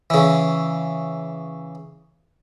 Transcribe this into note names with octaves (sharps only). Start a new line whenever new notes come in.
C#3 E3